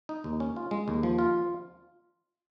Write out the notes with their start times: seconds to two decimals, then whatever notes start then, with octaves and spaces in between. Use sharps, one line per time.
0.09 D#4
0.24 D#2
0.40 C#4
0.56 F4
0.71 G#3
0.88 D#2
1.03 F3
1.18 F4